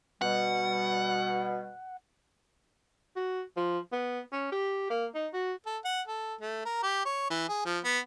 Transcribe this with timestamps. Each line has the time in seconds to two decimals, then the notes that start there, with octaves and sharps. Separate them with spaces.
0.22 B2 G3 F#5
3.16 F#4
3.56 F3
3.92 B3
4.32 C#4
4.52 G4
4.90 A#3
5.14 D#4
5.33 F#4
5.66 A4
5.85 F#5
6.08 A4
6.41 A3
6.65 A#4
6.83 G4
7.05 C#5
7.30 E3
7.49 G#4
7.65 F3
7.84 B3